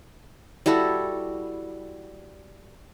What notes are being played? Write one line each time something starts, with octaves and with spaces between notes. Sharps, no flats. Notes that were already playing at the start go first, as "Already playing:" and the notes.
G3 E4 F#4 A4